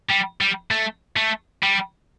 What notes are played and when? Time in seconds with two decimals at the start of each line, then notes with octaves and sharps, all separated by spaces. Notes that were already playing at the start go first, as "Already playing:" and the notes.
0.09 G3
0.41 G3
0.71 A3
1.17 A3
1.63 G3